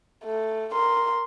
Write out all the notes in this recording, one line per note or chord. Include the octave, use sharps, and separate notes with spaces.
A3
A#4 C6